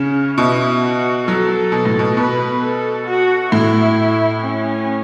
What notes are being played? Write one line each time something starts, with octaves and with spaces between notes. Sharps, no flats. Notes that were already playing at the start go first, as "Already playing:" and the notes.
Already playing: C#3 C#4
B2 E4
F#4
F#3 A4
B2
A2
B2
B2 B4
A4
F#4
A2 E4
C#4